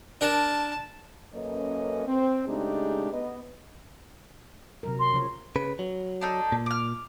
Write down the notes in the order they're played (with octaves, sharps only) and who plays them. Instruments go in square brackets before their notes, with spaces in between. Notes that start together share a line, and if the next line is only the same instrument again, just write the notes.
[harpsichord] D4 A#4 [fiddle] A5
[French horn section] F#2 A#3 C#4 A4 B4 D#5
C4
C#3 G#3 A3 D4 D#4 G4
B3 D#5
[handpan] C3 F#3 A#4
[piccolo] C6
[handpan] C#3 F3 C#5
[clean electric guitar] C#3 B4
F#3
[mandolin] D4 D#4 A4
[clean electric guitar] A#2
[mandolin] D6 F6